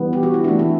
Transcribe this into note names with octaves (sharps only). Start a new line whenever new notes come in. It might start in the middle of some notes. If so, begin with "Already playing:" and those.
Already playing: E3 G3 B3
G4
F#4
E4
E3 A3 D4
E4